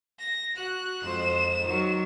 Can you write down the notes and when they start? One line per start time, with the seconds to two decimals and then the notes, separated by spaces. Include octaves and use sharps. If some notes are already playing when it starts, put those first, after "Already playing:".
0.19 A#6
0.55 F#4 F#6
1.02 F2 G#3 C5 E7
1.63 D#3 F#3